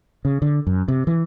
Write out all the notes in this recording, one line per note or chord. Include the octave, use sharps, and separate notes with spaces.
C#3
D3
F#2
C3
E3